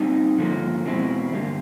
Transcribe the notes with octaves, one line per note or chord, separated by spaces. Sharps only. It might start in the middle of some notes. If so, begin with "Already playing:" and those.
Already playing: A#2 G3 C4 D#4
G2 D3 F3 A#3
E2 B2 G#3 C4 E4
G2 D3 G3 A#3